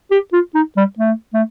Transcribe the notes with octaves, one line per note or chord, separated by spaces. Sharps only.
G4
F4
D#4
G3
A3
A3